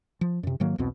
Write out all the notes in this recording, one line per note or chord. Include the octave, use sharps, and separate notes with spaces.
F3
F#2 C3
G#2 D#3 F#3 A#3
B1 E2 B2 C4